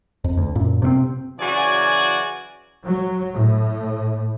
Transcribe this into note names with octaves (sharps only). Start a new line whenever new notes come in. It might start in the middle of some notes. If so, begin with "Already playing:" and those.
F2
D2
F#2 A#2
C3 A3 C4
C#3 E3 F#3 F#4 D5 G#5
F#3
A2